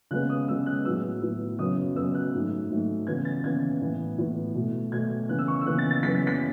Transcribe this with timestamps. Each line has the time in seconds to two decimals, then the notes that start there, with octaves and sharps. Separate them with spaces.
0.11 C#3 G#3 B3 F#6
0.29 D#6
0.48 C#3 G#3 B3 E6
0.66 F#6
0.85 A2 F#3 B3 E6
1.22 A2 F#3 B3
1.59 F#2 C#3 F#3 B3 D#6
1.96 F#2 C#3 F#3 B3 E6
2.14 F#6
2.33 G#2 F#3 A3
2.70 G#2 F#3 A3
3.07 C#3 E3 B3 G#6
3.25 A6
3.44 C#3 E3 B3 G#6
3.81 A2 E3 B3
4.18 A2 E3 B3
4.55 B2 A3
4.92 B2 A3 G#6
5.29 C#3 E3 B3 F#6
5.38 E6
5.48 C#6
5.61 E6
5.66 C#3 E3 B3 F#6
5.79 A6
5.91 A6
6.03 F#2 C#3 E3 B3 B6
6.15 A6
6.27 B6